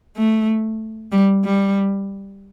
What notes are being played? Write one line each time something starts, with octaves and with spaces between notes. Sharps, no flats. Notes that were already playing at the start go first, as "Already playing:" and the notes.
A3
G3
G3